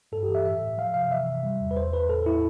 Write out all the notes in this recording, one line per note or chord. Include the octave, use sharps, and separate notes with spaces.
G2 A4
G4
E3
E5
A2 E5
A2
F3 F5
C3 F5
E3 E5
C3
G3
E2
B4
E2 C5
E2 B4
A2 A4
A2 E4